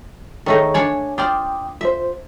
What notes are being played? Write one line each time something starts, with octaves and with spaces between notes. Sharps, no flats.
D#3 A3 D#4 G#4 C#5 C#6
D4 C#5 D5 G#5
F4 C5 D5 G5 D6 D#6
F4 C5 E5